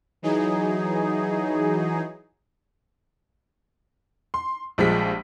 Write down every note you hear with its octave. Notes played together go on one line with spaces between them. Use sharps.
E3 F#3 D#4 G#4
C6
A#1 F3 G3 G#3 B6